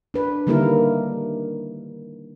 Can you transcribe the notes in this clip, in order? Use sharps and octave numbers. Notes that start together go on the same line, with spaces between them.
D4 B4
D3 D#3 G3 A#3 E4 A#4